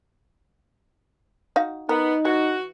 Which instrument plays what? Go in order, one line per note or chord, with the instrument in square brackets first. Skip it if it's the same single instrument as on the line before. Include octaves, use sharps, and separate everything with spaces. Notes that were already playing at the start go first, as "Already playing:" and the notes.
[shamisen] D#4 F#4 F5
[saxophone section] B3 [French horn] D#4 [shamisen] A#4
[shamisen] E3 [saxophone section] F#4